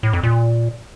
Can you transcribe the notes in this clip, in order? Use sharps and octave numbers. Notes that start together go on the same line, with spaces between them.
A2
F2
A#2